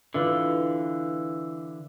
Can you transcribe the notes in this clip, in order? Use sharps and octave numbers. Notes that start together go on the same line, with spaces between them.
D3 E3 F4